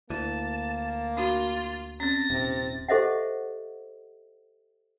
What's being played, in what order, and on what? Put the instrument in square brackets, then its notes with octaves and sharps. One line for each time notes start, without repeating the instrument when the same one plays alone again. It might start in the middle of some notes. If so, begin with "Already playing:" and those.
[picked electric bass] D2 [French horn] A#3 [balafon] E4 [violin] A5
[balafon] D4 F#4 [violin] F4
[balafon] C4 C#4 [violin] A6 A#6
[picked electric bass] D#1 [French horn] C3
[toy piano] G4 A4 C5 D#5 E5 F#5